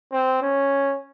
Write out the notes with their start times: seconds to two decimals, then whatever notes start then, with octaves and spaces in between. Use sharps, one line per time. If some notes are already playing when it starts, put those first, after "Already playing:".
0.12 C4
0.42 C#4